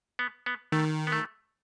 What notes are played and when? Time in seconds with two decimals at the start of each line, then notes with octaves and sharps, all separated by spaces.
0.19 B3
0.46 B3
0.72 D#3 A3
1.07 B3
1.12 A3